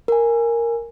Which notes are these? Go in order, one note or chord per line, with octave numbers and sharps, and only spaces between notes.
A#4 G#5